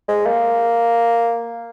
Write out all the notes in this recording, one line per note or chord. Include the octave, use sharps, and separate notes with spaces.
G#3
A#3